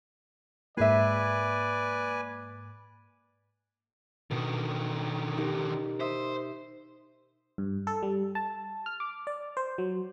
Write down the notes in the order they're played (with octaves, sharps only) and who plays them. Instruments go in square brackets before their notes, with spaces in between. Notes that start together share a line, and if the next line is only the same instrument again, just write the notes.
[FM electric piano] G#2 A#3 [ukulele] G#4 E5 [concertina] B4 G#5 [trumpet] D5
[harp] B2 [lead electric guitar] D3 D#3
[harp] D#4 G4 A#4
[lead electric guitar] C5 [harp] E5 D#6
[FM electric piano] G2
A4
G3
A5
F6
D6
D5
C5
F#3